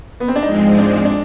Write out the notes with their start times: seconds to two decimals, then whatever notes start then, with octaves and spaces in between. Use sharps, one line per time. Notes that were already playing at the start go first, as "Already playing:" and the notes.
0.20 B3
0.28 C4
0.36 D4
0.43 G#2 F3 G#3 C4 D#4
0.78 D4
1.05 D4